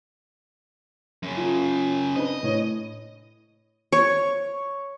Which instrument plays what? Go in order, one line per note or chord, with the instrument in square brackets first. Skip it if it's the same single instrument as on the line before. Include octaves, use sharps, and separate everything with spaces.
[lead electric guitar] F#2 C#3
[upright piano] F4
[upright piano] C4 D4 B4 [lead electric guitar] D#5
[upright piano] A2 C#5
[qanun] C#5